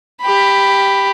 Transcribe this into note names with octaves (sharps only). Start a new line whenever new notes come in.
G4 B5